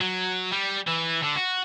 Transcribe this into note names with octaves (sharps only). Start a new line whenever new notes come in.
F#3
G3
E3
D3
F#4